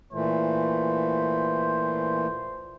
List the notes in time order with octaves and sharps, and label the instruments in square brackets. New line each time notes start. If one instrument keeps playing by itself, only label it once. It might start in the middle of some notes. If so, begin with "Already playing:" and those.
[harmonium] A#2 E3 A3 [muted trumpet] C5